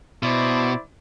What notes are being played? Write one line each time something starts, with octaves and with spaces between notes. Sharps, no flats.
B2 E4 C5 D5